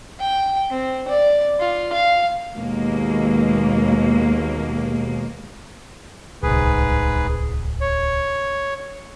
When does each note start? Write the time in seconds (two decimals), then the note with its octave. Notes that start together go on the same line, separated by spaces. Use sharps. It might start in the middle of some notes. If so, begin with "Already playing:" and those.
0.20 G5
0.70 C4
1.08 D5
1.59 F4
1.93 F5
2.55 D#2 B2 G#3 A#3
6.43 D1 C2 G#2 G#4 B4
7.81 C#5